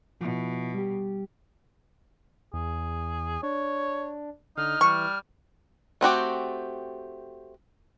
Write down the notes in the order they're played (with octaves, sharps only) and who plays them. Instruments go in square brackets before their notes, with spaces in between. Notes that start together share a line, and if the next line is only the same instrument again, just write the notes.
[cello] B2 [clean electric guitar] F3 E4
[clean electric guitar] G3 G4
[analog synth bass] E2 [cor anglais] G#4
[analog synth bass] D4 [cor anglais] C#5
[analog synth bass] D3 [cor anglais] D#4 [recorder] F6
[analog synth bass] E3 [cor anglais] G3 [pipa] C#6
[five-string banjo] A3 C4 F#4 G4